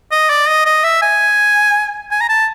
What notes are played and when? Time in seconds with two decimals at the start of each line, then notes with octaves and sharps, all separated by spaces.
0.11 D#5
0.30 D5
0.48 D#5
0.66 D#5
0.84 E5
1.02 G#5
2.11 G#5
2.21 A#5
2.29 A5